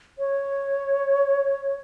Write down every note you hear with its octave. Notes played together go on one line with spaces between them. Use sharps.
C#5